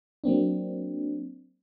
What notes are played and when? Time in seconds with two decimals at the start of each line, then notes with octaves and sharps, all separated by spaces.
0.24 F#3 A#3 C4 D4